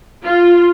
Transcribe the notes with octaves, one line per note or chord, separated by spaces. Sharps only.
F4